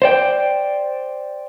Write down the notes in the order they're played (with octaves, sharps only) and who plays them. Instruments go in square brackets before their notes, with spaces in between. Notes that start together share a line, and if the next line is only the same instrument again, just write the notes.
[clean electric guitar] C5 D5 G5